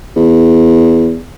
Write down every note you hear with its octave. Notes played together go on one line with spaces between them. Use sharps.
E2